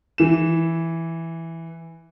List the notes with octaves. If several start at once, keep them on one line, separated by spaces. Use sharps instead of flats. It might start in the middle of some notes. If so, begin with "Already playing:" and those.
E3 E7